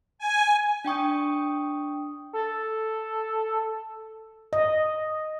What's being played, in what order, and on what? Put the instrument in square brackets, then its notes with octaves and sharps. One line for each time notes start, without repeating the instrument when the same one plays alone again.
[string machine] G#5
[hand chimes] D4 G5 C#6 D#6
[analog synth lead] A4
[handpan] D#5